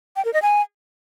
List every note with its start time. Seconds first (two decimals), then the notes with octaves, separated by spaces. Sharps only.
0.16 G5
0.25 A#4
0.33 D#5
0.42 G#5